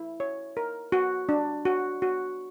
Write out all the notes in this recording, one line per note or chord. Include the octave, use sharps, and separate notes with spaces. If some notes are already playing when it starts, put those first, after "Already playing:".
Already playing: E4
C#5
A#4
F#4
D4
F#4
F#4